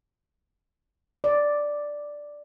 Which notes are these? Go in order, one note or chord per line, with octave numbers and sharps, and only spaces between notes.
D5